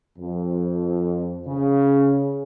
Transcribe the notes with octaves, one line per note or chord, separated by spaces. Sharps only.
F2
C#3